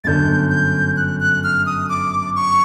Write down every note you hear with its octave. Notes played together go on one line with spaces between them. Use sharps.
G1 F#2 D3 G6 A6
G6
F#6
F#6
F6
D#6
D6
C#6